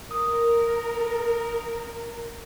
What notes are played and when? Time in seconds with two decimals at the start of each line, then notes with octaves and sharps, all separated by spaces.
0.11 A#4 D#6